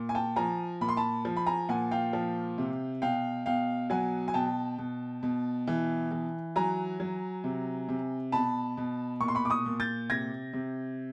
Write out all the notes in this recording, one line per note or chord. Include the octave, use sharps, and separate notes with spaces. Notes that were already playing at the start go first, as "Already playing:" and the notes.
Already playing: A#2
G#5
G5 A5
F3 G#5 A#5
A#2 B5
C6
A5 B5
F3
B5
G#5 A#5
A#2 F#5 G#5
F5 G5
F3
C3
B2 F5 G5
B2 F5 G5
F#3 F#5 G#5
G#5
B2 G5 A5
B2
B2
E3
E3
F#3 G#5 A#5
F#3
C3
C3
B2 A5 B5
B2
A#2 C#6
C6
B5 C#6
D6
C#6 D#6
A#2
G6 A6
C3 G#6 A#6
C3